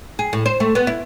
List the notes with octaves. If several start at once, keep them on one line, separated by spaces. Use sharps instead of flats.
G#4
A2
C5
A3
B3
E4